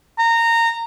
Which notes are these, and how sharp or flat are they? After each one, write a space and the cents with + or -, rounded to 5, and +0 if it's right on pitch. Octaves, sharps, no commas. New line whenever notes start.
A#5 -15